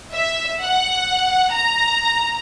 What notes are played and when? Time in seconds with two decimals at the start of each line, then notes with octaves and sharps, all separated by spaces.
0.14 E5
0.61 F#5
1.52 A#5